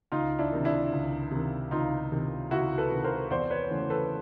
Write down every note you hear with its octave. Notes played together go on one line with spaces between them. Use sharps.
C#2 D#4 F4
D4 E4
C3 D#3
D4 E4
C#2
C3 D#3
C#2 D#4 F4
C3 D#3
C#2 E4 F#4
A4 B4
C3 D#3
A#4 C5
E2 C5 D5
B4 C#5
C#3 E3 A3
A4 B4